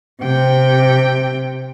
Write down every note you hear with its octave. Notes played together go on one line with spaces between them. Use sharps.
C3 G5